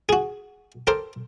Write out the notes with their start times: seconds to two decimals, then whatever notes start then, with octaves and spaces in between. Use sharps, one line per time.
0.09 F#4 G#4
0.87 G4 A4 A#4 C5